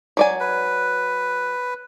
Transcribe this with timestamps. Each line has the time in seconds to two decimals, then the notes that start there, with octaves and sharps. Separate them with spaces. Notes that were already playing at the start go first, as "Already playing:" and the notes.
0.17 F#3 D5 G#5
0.40 B4